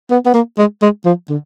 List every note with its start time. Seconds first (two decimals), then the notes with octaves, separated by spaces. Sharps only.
0.11 B3
0.26 B3
0.34 A#3
0.58 G#3
0.82 G#3
1.05 F3
1.30 D3